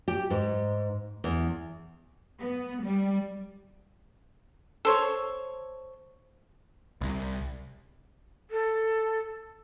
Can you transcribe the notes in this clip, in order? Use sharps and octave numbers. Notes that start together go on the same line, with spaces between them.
G4
G#2
E2
B3
G3
A4 C5 C#5
C2
A4